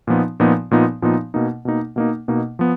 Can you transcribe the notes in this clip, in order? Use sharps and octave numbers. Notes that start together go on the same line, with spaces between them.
A#2 F3 B3 D#4
A#2 F3 B3 D#4
A#2 F3 B3 D#4
A#2 F3 B3 D#4
B2 A#3 D#4
B2 A#3 D#4
B2 A#3 D#4
B2 A#3 D#4
F3 B3